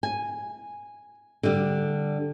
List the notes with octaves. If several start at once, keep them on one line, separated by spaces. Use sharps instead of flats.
G#5
D3 G3